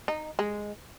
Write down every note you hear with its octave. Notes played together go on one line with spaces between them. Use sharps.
D#4
G#3